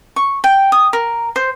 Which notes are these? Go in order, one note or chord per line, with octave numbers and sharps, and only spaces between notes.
C#6
G5
D#6
A#4
C5